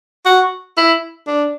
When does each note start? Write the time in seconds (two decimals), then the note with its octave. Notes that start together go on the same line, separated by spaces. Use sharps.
0.26 F#4
0.77 E4
1.27 D4